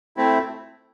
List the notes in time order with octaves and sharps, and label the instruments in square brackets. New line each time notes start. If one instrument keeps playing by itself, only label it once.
[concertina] A3 C4 E4